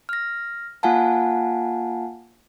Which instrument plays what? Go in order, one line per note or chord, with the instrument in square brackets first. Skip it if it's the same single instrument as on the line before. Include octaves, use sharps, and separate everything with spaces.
[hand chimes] F6 A#6
A#3 F4 F5 F#5 G#5 A5